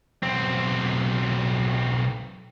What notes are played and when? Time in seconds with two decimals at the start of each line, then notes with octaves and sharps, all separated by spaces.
0.23 B1 C4